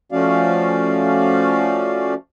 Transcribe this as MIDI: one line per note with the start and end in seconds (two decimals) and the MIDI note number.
0.12 2.14 53
0.12 2.14 57
0.12 2.14 61
0.12 2.14 66
0.12 2.14 74
0.12 2.14 77